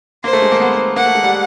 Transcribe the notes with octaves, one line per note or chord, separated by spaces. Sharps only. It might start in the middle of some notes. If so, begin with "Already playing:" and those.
A#3 C5
A3
G#3
A#3
B3
A#3 F#5
A3
G#3
G3